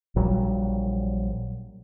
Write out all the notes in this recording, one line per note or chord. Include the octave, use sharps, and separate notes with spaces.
A#1 A#2 F#3 G3